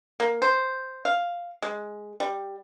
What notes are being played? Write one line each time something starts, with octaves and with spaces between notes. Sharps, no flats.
A#3
C5
F5
G#3
G3